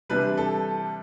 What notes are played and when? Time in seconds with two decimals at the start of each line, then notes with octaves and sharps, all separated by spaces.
0.09 C3 E3 G3 D4 B4
0.37 A4